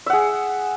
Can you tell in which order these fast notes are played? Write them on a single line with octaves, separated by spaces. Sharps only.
E5 F#5 G#4